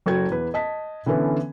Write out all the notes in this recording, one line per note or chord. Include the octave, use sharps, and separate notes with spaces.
F#1 F#4 A4 G5 G#6
E2 B4
D#5 A5 B6
D3 E3 B3 C#4 A4 B4